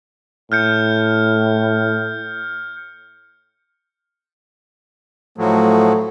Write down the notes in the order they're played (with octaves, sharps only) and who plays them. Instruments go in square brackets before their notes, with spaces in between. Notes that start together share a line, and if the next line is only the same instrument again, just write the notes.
[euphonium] A2 [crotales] F6 G6 C#7
[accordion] A2 F3 F#3 [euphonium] A3